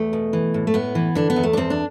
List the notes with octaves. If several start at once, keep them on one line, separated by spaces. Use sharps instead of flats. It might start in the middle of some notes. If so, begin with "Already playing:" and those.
Already playing: E2 A3
B2
E3
A2
A3
A2 B3
E3
D3 D4
B3
E2
A3
D4
E2 C4
D4